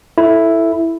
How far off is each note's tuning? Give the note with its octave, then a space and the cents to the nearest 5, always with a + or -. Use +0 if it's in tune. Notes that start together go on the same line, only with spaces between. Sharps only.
E4 +0 A4 +0